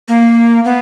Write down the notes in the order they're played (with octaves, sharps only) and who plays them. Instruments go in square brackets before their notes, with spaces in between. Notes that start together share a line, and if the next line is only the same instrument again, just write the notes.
[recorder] A#3
B3